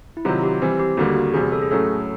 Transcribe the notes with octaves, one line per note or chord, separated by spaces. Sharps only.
E4
C3 D#3 F#3 F4
G4
E3 G3 C4
G4
D#2 D3 G3 A#3 F#4
F#4
E2 C3 E3 G3 G#4
A4
G#4
A2 F#3 A3 C#4 A4